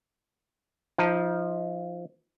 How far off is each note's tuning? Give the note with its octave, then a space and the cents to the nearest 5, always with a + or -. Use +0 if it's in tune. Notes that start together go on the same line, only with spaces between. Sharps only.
F3 +0 D#4 +35 A5 +35